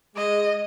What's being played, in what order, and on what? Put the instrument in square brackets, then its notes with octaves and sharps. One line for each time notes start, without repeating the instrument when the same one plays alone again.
[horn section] G#3 [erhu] D#5